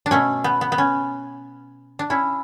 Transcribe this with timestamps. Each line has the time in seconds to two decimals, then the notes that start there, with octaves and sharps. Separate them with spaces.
0.06 D4
0.11 B2 A3 C#4
0.44 B3
0.61 B3
0.72 B3
0.78 C#4
1.99 D4
2.10 C#4 E4